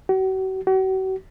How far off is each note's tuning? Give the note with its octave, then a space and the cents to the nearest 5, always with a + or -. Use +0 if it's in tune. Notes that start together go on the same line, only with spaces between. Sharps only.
F#4 +40
F#4 +40